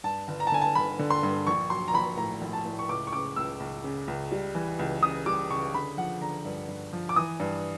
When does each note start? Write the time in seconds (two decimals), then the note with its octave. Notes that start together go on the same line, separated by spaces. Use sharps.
0.04 G2 A5
0.28 G1
0.40 A#5
0.47 A5
0.52 D3 G#5
0.62 A5
0.75 G1 B5
0.99 D3
1.10 C6
1.23 G2
1.47 A#1 C#6
1.70 F#3 C6
1.88 A#5
1.94 A#1 B5
2.17 A2 A#5
2.42 A#1
2.53 A5
2.66 A2
2.79 C#6
2.89 C#2 D6
3.07 C#6
3.13 C#3 D6
3.36 C#2 E6
3.60 C#2
3.84 C#3
4.08 C#2
4.32 G3
4.55 E3
4.79 C#2
5.02 C#3 D#6
5.26 G3 D6
5.50 C#3 C#6
5.74 D3 B5
5.97 F3 F#5
6.21 D3 A#5
6.45 G2
6.69 G2
6.93 F3
7.09 D6
7.16 E3 D#6
7.40 G2